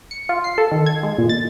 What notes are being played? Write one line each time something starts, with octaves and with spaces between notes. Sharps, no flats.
C#7
F4
C7
A4
D#3
G#6
G#3
A#2
A6